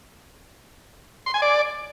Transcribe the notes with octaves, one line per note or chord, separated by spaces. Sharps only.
C6
G#5
D5